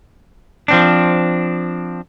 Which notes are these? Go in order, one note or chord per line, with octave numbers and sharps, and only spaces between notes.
F3 C4 D4